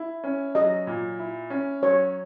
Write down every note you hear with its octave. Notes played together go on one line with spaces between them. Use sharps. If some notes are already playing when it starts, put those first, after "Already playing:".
Already playing: E4
C#4
F#3 D#5
A#2
E4
C#4
F#3 C#5